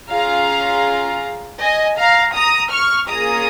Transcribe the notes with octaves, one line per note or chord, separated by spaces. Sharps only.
C#4 F4 G#4 F5 A#5
D#5 G#5
F5 A#5
A#5 D#6
C#6 F6
A#3 C#4 F4 G#4 A#5 D#6